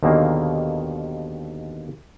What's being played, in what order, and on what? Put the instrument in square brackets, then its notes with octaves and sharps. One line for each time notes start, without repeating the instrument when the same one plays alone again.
[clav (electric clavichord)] D#2 B2 D3 D#3 A#3 G#4